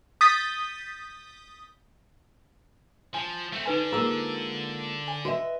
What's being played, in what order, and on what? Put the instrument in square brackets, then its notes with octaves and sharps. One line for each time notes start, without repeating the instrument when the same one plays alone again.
[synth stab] D#6 G6 A6 B6
[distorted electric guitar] F3 [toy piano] G#5
[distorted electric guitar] A3 C4
[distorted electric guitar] D3 [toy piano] D#4 B4 G#5
[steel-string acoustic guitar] G#3 A#3 F4 [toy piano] G#4 A#5 E6
[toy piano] G#5
[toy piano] F#4 [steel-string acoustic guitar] B4 D#5 E5